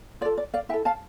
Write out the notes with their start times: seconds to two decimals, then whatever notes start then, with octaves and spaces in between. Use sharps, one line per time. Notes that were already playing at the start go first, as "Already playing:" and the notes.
0.21 F4 D5
0.25 A4
0.38 D5
0.54 D5 F5
0.69 E4 E5 G5
0.74 A4
0.85 F5 A5